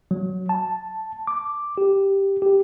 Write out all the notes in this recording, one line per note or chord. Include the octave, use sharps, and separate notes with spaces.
F#3
A5
D6
G4
G4